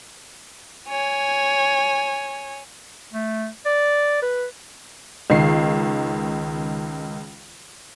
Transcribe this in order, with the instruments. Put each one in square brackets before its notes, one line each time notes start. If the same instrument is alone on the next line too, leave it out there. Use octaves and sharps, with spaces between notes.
[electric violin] C#5 G#5
[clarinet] A3
D5
B4
[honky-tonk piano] C#2 D#3 C7